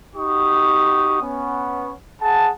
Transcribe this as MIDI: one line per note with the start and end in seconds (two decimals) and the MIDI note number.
0.15 1.16 63
0.15 1.16 66
0.15 1.16 67
0.15 1.16 85
0.15 1.16 87
1.20 1.90 59
1.20 1.90 61
2.21 2.48 68
2.21 2.48 78
2.21 2.48 81